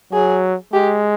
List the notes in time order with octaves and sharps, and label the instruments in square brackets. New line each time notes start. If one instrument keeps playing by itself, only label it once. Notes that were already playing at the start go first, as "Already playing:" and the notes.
[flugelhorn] F#3 [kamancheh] G#4
[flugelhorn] G#3 [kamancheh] G4